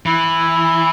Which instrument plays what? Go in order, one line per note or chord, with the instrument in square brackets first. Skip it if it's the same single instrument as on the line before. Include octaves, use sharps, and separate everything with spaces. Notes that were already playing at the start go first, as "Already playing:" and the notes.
[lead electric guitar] E3 [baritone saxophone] E4